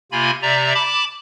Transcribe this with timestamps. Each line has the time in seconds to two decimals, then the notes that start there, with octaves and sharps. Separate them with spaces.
0.12 C3 A#3 F4 G#5 B5
0.42 C3 D5 E5 A#5
0.75 A5 B5 D6